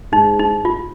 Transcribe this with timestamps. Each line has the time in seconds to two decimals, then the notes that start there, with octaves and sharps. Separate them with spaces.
0.12 G#2 D#4
0.39 D#4
0.65 F4